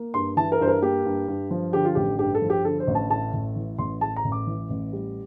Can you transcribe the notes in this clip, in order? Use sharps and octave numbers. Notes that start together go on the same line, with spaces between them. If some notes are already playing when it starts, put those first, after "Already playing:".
Already playing: A#3
G2 C6
E3 A5
A#4
G2 C5
A#4
A#3 G4
G2
G2
F3
D3 G4
F4
A1 G4
G2 G4
A4
F3
G4
D3 A4
C5
A1
A5
A2 A5
A1
E3
A1 C6
A2 A5
A#5
A1
D6
E3
A1
G3